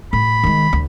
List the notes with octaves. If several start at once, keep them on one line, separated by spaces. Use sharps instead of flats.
A2 B5
D#3 G#3
D2